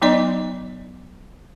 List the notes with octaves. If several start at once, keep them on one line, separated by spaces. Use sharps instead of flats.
F#3 B3 D#4 D5 D#5 C6